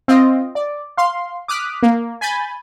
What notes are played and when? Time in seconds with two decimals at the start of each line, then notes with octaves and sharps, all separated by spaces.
0.08 C4 F4 D#5
0.55 D5
0.97 F5 C6
1.48 D6 D#6 F6 F#6 B6
1.83 A#3
2.21 G#5 B5 G6 A6